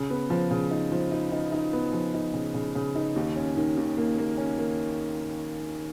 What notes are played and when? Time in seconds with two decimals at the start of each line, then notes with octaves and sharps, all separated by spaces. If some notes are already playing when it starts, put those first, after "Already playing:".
Already playing: C#3
0.10 B3
0.30 F3
0.51 C#3
0.71 D#4
0.92 F3
1.12 D#4
1.32 D#4
1.52 D#4
1.73 B3
1.93 F3
2.14 D#4
2.34 C#3
2.54 C#3
2.75 C#3
2.95 D#4
3.16 D#2
3.36 C#4
3.56 D#3
3.77 D#2
3.97 A#3
4.18 A#3
4.38 C#4
4.59 A#3